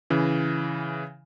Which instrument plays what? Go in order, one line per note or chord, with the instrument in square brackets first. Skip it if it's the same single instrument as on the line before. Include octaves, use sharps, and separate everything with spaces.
[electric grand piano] C#3 E3